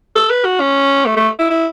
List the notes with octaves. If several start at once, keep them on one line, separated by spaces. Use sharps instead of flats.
A4
B4
F#4
C#4
A3
A3
E4
E4